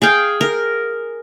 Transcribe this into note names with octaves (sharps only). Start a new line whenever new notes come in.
G#4 F5 G5
A#4